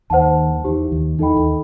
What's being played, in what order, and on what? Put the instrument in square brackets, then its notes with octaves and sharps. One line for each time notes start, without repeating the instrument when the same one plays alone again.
[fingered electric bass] D#2 D#3 [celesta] C5 F#5 A5
[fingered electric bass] D#3
[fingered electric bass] E2 E3 [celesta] D#4 G4 C5
[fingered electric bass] D#2 D#3
[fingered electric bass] E2 E3 [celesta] D#4 A4 D#5 G5 B5
[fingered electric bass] D#2 D#3